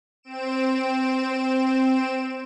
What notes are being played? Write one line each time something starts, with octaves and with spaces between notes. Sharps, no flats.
C4 D7 E7